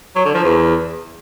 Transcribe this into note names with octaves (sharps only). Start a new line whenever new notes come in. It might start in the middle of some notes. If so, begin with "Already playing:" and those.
F#3
D3
F3
E2